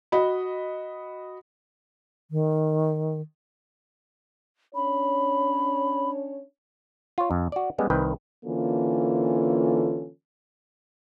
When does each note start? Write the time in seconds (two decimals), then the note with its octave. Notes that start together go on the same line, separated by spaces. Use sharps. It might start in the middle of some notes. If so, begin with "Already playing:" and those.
0.12 F#4 D#5 B5
2.31 D#3
4.75 C#4 D4 C#5 B5
7.18 F4 C#5
7.31 F2
7.52 F#4 D5
7.78 G3 G#3 B3 C#4
7.90 C2 D#3 B4 G5
8.45 D3 E3 A#3 C#4 F4 A4